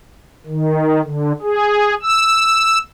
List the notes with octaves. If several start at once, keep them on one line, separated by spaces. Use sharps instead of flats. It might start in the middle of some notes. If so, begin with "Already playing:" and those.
D#3
D3
G#4
E6